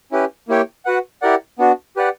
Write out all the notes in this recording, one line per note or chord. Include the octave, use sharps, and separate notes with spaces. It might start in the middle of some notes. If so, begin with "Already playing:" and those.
C#4 E4 G4 B4
A#3 E4 G4 C#5 G5
F#4 B4 F#5
E4 G4 A#4 D5 F#5
B3 D4 F#4
G4 B4 D5 F#5